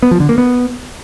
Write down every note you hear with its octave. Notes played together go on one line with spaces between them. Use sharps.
B3
F3
D3
A#3
B3